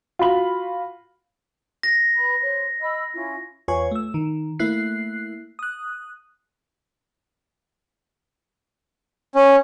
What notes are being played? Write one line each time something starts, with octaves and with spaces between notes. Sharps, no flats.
F4 F#4 B5 F#7
A#6
B4 B5
C5 C#5
D#5 B5 E6
C#4 E4 F4
E2 F4 B4 C#5 G#5 C#6
A3 E6
D#3
A3 A#3 E4 F#6 C7
D#6 F#6
C#4